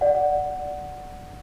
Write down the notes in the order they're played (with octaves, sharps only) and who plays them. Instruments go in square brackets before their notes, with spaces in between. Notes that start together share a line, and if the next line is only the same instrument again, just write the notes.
[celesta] D5 F#5